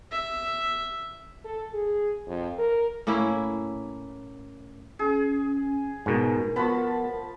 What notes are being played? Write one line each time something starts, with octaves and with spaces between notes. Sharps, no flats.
E5
A4
G#4
F2
A#4
A2 A#3 C#4 E4
C#4 G#4
G#2 B2 A#4
F3 B3 F#4 A5 B5